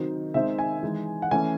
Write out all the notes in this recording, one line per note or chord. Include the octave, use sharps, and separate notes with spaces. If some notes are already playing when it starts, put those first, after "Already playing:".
Already playing: D#3 F#3 C4 D#4
D#3 G#3 C4 D#4 E5
G#5
E3 G#3 D#4
F#5
E3 A3 C#4 G#5